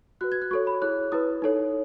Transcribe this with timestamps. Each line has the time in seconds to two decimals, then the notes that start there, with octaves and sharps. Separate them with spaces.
0.21 F#4 B4 F#6
0.32 G#6
0.42 F#6
0.51 F#4 A4 C#5 C#6
0.67 B5
0.82 E4 G#4 C#5 F#6
1.12 E4 B4 D#6
1.42 D#4 A4 C#5